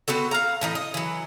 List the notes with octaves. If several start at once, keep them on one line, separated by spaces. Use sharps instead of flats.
B3 C4 F#4 A4
F5 A#5
A2 E3 D#4
D#5
E3 F#3